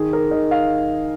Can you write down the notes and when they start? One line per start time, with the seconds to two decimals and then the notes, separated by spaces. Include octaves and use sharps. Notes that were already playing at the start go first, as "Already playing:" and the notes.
Already playing: D#3 G#4
0.13 A#4
0.31 D#3 D#5
0.51 F5